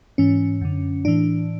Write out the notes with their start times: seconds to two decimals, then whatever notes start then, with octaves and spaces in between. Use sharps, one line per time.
0.18 G#2 E3 C#4
0.61 F#2 D3
1.05 A2 E3 D4